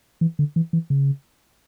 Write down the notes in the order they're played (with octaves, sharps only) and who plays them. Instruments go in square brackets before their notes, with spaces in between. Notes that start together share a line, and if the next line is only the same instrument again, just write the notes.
[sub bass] E3
D3
E3
E3
C#3